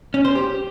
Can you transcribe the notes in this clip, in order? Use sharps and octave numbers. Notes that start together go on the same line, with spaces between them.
C#4
C5
G4